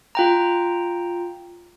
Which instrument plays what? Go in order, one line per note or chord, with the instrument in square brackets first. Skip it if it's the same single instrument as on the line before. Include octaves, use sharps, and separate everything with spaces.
[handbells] F4 G5 A#5